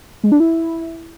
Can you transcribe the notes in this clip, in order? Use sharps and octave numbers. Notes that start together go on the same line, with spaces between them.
G#3
D4
E4